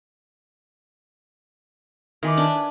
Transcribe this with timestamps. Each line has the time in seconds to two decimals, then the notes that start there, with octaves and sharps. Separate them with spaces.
2.23 D#3 E4 B4 G#5 D6
2.37 D4